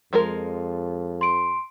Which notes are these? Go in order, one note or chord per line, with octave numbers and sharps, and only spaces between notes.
F2 F3 G#3 A#4
C6 D7